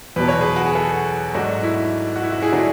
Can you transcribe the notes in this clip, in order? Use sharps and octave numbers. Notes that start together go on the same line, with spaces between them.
E2 B2 F#3 B4
C#5
G#4 B4
F#4
G#4
F#4 A4
G#2 F#3 A3 D4 F#4
E4
F#4
E4
F#4
E4 G#4
D3 F#3 A3 D4